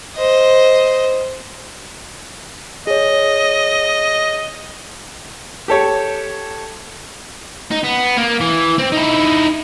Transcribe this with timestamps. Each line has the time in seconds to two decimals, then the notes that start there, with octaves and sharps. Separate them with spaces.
0.16 C5 D#5
2.87 G#4 C#5 D#5
5.68 G4 A4 C#5
7.72 D#4
7.84 B3
8.17 A#3
8.41 E3
8.78 C4
8.92 D#4 E4